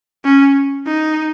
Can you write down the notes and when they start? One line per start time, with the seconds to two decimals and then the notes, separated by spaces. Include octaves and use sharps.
0.25 C#4
0.86 D#4